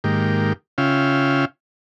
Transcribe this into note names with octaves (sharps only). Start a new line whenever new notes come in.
G#2 D#3 A#3 G4
C#3 C#4 F4 E5 F5 G5